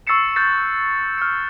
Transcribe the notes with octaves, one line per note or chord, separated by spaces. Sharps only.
C#6 E6 A6 C7 C#7 E7
E6 F#6 G6 A6 C7
F6 C#7